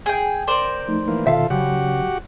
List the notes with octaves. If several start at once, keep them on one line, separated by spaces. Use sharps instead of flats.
G#4 G5
A#4 C5 D5
F3 A3 D#4
E3 A#3
B2 D#3 F4 A4 E5 F5
C#3 F#3 F#4 G4 F#5